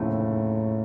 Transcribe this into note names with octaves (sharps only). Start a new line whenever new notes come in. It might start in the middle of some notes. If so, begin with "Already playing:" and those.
Already playing: F1 D#2 A2 C#3 A3 C4